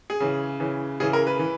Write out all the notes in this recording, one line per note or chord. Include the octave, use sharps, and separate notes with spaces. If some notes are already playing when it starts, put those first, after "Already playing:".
G#4
C#3 E3
C#3 E3
C#3 E3 G#4
A#4
B4
E3